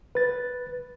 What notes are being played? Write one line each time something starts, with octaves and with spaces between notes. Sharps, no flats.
B4 A6